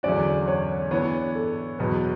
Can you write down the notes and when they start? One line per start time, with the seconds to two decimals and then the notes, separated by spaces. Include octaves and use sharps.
0.03 E2 D3 F#3 C#4 F#4 D5
0.47 C#5
0.91 E3 B3 D4 C#5
1.35 A4
1.79 E2 B2 F#3 B4